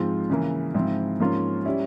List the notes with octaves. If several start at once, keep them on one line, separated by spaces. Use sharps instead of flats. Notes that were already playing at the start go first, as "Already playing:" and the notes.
Already playing: G#2 F3 G#3 C4 F4
C#3 E3 A#3
G#2 F3 C4 E4
G#2 F3 A#3 C#4 F4
G3 C#4 E4